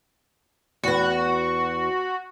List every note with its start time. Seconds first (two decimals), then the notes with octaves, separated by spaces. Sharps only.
0.83 E2 B3 F#4